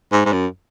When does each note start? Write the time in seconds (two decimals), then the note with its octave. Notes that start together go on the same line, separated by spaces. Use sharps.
0.12 G#2
0.26 G#2
0.33 F#2